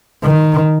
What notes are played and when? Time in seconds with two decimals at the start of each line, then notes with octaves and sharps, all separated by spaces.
0.24 D#3